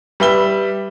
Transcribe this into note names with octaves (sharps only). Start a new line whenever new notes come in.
G3 B4 E5 G7